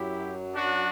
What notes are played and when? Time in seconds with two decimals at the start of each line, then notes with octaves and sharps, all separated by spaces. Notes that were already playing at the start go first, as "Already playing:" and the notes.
Already playing: F#2 F#3 E4 G4
0.55 D4 F#4